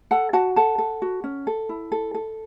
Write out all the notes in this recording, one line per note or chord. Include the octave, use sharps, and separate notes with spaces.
A4 F#5 A5
F#4 F#5 A5
A4 F#5 A5
A4
F#4
C#4
A4
E4
A4
A4